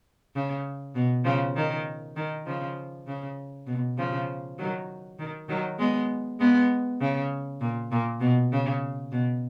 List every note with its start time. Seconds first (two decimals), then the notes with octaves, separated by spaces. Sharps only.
0.35 C#3
0.95 B2
1.25 C#3 F3
1.56 D#3
2.16 D#3
2.46 C#3 F3
3.07 C#3
3.67 B2
3.97 C#3 F3
4.58 D#3 F#3
5.19 D#3
5.49 D#3 F#3
5.79 G#3 B3
6.40 G#3 B3
7.01 C#3
7.61 A#2
7.92 A#2
8.21 B2
8.52 C#3
9.12 B2